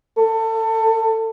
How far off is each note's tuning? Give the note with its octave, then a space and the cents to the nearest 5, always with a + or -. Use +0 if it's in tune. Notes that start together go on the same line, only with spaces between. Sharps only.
A4 +25